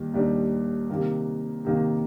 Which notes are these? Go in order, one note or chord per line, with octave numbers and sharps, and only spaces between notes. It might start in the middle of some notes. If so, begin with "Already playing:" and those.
Already playing: D#2 D#3 G3
D#2 D#3 G3 D4
C3 D#3 A#3
C3 D#3 A#3